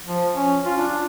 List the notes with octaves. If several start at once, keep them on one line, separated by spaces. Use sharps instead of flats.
F3
C#4
F4
D4